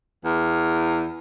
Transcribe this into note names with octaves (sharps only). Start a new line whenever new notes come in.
E2